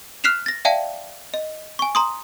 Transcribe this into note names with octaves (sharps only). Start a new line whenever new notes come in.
F6 F#6 B6 C7 E7 F7
A6 A#6
D5 E5 F5 G5 A5
D#5
G#5 C#6
A#5 C6 D#6